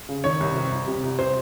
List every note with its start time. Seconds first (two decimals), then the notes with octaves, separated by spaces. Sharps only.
0.09 C#3
0.24 D#3 C#5
0.41 C2
0.56 C3
0.72 C2
0.88 C3
1.03 C2
1.19 C3 C5